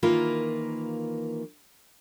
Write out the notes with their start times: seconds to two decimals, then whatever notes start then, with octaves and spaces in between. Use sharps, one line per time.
0.03 D#3 E3 A#3 F4 A#4 B4